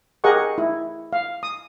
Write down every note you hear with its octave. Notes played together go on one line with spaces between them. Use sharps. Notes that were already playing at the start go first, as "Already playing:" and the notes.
G4 G#4 A#4 D#5 F#5 C#6
E4
F5
D#6